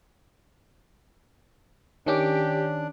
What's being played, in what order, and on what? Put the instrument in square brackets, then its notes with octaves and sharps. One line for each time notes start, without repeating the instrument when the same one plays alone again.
[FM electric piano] D#3 C#4 D6 [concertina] D4 [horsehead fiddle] G4